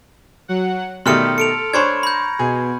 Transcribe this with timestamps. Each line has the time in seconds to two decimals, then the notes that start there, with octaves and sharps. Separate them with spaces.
0.48 F#3 F#5
1.06 B2 D#3 A3 G4 D5 C6 F6 C#7
1.38 A4 C#7 D7 F7
1.74 D4 C5 C#5 B5 C#6 G#6
2.03 A#5 B5 G6
2.39 B2 G#4